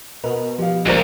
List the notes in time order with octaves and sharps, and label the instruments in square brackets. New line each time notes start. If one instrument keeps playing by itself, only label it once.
[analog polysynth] B2 [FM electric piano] A#4 B4 [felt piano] D#5
[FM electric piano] F3 [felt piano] G4 F5
[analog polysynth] G#1 A#3 [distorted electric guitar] C#2 [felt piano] A#4 C5 D5